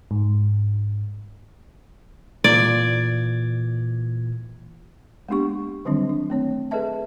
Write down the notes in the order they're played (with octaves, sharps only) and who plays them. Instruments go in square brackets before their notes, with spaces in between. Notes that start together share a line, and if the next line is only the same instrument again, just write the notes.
[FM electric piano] G#2
[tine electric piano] A#2 E3 G#6 [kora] D5
[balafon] G#3 A#3 B3 D4 G4 C#6
D3 D#3 F#3 G3 C4 D4
D4
A3 C4 C#5
G#4 A4 B4 D#5 E5 A5